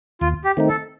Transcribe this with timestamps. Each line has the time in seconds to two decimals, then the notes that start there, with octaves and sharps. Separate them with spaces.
0.21 D#2 F4
0.44 G4
0.57 D#3 A3 C4 D#4
0.69 A4